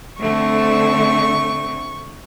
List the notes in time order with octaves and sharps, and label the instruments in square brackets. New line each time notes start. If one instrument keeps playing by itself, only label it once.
[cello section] D3 A3 C4 [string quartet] C#6